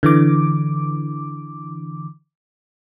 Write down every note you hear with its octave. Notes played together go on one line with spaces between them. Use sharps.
D3 E3 D6